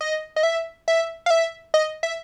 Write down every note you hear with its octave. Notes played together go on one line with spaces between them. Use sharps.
D#5
D#5
E5
E5
F5
E5
D#5
E5